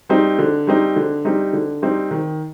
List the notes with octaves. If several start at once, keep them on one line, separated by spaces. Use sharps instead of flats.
G3 C4 D#4
D3
G3 C4 D#4
D3
G3 C4 D#4
D3
G3 C4 D#4
D#3